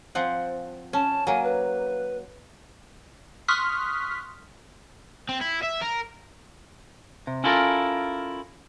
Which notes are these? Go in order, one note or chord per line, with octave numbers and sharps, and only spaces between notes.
F3 C4 F#5
C#4 A5
F#3 A#3 G#5
B4
C6 C#6 D#6 F6 F#6 B6
C4
E4
E5
A#4
C3
C#4 E4 F4 A4 A#4